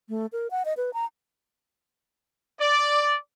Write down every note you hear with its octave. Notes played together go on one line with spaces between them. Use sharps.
A3
A#4
F#5
D#5
B4
A#5
D5